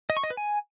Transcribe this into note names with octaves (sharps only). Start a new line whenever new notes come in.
D#5
C#6
D#5
B4
G#5